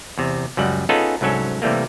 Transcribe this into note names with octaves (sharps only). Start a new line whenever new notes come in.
E2 C3
C#2 F#2 G3 F#5
B3 C#4 D#4 F4 G#4 A4
C2 G#2 F#3 C#4 A4
C3 E3 G3 A3 A#3